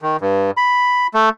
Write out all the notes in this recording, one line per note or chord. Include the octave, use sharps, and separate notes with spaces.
D#3
G2
B5
A3